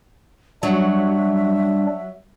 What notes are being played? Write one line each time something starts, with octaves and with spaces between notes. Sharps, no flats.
F#3 G3 D4 E5